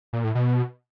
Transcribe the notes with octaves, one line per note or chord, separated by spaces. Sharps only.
A#2
A2
B2